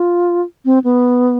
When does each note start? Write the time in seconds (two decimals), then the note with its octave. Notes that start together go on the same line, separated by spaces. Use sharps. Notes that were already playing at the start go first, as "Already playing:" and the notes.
Already playing: F4
0.65 C4
0.84 B3